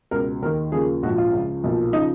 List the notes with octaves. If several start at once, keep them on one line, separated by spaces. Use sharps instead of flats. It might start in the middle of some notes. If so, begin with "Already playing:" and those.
C#2 B2 A#4
D#2 D#3 A#4
D#2 C#3 F3 G#4
A#1 G#2 F3 F#4
F4
C#2 C#3 F3
B1 A#2 F3
C#3 F3 D#4